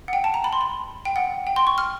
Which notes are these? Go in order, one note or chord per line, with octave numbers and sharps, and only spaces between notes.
F#5
G5
A5
A#5
B5
C6
B5
G5
F#5
G5
C6
C#6
F6